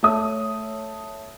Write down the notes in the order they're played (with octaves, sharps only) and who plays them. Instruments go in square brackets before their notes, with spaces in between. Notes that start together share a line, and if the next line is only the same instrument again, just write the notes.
[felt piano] A3 C#5 E5 D#6